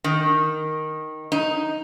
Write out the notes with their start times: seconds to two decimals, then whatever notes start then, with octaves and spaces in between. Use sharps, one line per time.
0.04 D#3
1.32 D#4